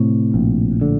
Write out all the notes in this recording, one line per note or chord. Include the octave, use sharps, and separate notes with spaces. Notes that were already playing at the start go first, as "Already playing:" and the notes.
Already playing: A2 C3
A#1
D3